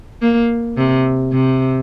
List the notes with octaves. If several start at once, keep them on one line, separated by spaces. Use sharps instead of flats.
A#3
C3
C3